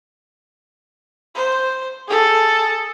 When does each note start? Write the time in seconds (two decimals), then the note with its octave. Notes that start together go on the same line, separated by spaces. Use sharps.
1.35 C5
2.08 G#4 A4